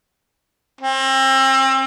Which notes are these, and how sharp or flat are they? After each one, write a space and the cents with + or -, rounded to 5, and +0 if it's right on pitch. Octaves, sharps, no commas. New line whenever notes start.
C4 +35